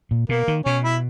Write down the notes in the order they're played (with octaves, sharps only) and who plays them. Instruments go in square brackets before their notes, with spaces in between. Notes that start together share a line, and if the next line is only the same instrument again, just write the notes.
[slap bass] A#2
[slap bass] B2 [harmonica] A#3
[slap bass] D#3
[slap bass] B2 [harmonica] C#4
[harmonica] E4